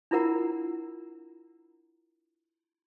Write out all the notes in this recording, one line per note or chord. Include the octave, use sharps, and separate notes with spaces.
D4 E4 F4 A#4 F#5 A#5